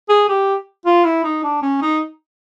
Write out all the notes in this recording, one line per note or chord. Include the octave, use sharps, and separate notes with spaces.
G#4
G4
F4
E4
D#4
D4
C#4
D#4